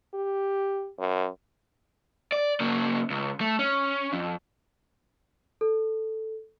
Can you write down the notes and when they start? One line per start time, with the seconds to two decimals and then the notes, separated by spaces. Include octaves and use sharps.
0.14 G4
0.99 F#2
2.32 D5
2.60 C#3 A#3
3.10 C#2
3.41 A3
3.59 C#4
4.13 F2
5.61 A4